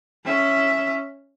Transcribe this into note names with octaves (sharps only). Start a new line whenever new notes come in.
C#4 E5